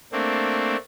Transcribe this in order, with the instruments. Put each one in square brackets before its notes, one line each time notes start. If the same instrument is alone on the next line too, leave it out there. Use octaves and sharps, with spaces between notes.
[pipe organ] A3 A#3 C4 D4